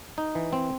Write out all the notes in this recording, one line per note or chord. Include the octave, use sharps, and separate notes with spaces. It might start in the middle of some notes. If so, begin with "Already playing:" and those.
D#4
E3
C4